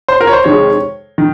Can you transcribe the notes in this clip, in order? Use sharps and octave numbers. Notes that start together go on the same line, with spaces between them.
C5
A#4
C#5
C5
F2 C3 D#3 G#3 C#5
D#3